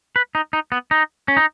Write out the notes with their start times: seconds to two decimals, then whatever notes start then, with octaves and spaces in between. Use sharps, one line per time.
0.16 B4
0.35 D#4
0.53 D#4
0.72 B3
0.91 D#4
1.28 C#4
1.37 D#4